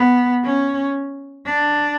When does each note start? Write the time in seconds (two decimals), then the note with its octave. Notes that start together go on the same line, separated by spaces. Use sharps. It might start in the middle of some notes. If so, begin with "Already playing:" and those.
Already playing: B3
0.44 C#4
1.46 D4